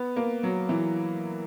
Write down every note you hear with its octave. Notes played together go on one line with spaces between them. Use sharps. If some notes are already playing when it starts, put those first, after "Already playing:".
Already playing: B3
A#3
F#3
E3